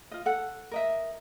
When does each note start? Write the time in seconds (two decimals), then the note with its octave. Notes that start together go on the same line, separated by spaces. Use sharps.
0.11 F4 D#5
0.26 A4 F#5
0.71 A#4 D#5 E5